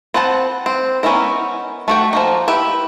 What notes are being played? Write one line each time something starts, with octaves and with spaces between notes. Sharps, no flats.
C4 B4 F#5 A5
C4
B3 C#4 D#4 E4 A#4
A3 F#4 G5
F3 A#3 D#4
E4 G4 B4